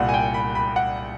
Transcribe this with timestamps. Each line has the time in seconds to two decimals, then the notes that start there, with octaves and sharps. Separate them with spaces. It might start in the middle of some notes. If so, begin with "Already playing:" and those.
Already playing: C2 A#2 F#5
0.09 G#5
0.14 G5
0.34 B5
0.55 B5
0.76 F#5